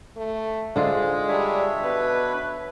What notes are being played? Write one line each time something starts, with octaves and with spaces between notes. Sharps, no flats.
A3
G#2 D3 G#3 F4
G3 D4 C#5 E5
B2 B4